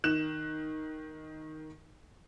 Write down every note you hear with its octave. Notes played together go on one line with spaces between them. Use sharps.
D#3 F#6 E7